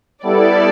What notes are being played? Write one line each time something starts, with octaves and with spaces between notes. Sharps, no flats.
G3 B3 E4 A4 D5